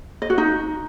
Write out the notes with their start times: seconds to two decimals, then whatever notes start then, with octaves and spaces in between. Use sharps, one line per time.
0.22 D#5
0.30 F#4
0.38 D#4